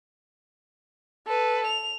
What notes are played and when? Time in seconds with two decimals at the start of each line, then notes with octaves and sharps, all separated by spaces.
1.27 A4 B4
1.66 F7